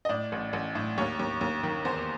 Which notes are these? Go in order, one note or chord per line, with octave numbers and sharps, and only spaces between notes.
D#5
A2 D5
A1
A1
A2
D#2 C#5
D#2
D#2
D#3
E2 C5